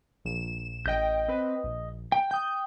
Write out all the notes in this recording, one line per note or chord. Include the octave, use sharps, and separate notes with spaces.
A#1 E7
A1 D#5 G5 G6
C4 B4
A#1
G5
G5 D#6 G6